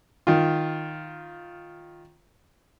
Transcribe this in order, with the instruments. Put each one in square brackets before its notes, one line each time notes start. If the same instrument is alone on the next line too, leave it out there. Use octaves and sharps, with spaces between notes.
[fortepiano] D#3 F4